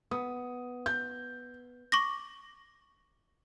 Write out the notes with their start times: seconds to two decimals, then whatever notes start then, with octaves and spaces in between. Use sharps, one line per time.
0.11 B3 D#6
0.86 G6
1.92 C#6 D6 A#6